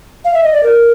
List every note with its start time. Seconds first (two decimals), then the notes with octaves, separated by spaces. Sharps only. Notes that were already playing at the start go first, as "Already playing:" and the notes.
0.25 F5
0.34 E5
0.43 D#5
0.53 D5
0.63 A#4